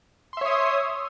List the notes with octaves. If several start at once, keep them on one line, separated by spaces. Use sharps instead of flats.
C#5 E5 C6 D#6